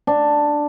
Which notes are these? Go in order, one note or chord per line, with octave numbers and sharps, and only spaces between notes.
D4